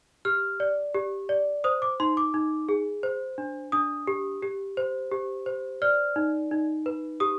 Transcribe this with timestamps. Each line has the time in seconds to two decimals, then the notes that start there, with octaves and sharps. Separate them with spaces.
0.25 G4 F6
0.60 D5
0.94 G4
1.29 D5
1.64 C5 D#6
1.82 D6
2.00 D#4 C6
2.17 D6
2.34 D#4
2.69 G#4
3.03 C5
3.38 D4
3.72 D4 D#6
4.07 G4
4.42 G4
4.77 C5
5.11 G4
5.46 C5
5.82 D5 F6
6.16 D#4
6.51 D#4
6.86 B4
7.20 G4 D#6